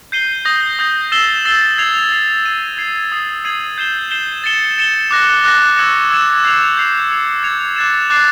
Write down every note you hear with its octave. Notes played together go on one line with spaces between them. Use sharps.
G6 C7 D#7 G7
D#6 G6 A#6
D#6 G6 A#6
E6 A6 C7 E7 G7
E6 A6 C7 E7 G7
G#6 C7 F7
G#6 C7 F7
G#6 C7 D#7
G#6 C7 D#7
D#6 G#6 C7 D#7 F#7
D#6 G#6 C7 D#7 F#7
G6 C7 E7 G7
G6 C7 E7 G7
A6 C#7 E7 G7
A6 C#7 E7 G7
D6 F#6 A#6
D6 F#6 A#6
C#6 E6 G#6 C#7 E7
C#6 E6 G#6 C#7 E7
G6 C7 F7
G6 C7 F7
E6 G#6 C#7 F7
E6 G#6 C#7 F7
D6 F#6 A6 C7 E7
D6 F#6 A6 C7 E7